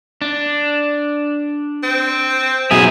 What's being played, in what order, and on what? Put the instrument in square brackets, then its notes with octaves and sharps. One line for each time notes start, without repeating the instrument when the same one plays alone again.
[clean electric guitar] D4
[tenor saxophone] C4
[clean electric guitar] B2 F#3 E5 [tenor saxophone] G#4